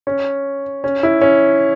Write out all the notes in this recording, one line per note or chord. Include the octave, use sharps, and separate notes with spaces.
C#4
C#4
E4
C#4